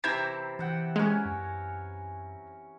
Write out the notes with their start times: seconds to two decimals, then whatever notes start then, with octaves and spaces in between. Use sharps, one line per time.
0.04 C3 E3 C4 E4 A#5 G#6
0.59 E3 E5 F#5 G5
0.96 G#3 C#4 A#4 G#5
1.25 F#2